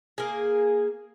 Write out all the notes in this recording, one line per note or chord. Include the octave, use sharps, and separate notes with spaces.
A#3 G#4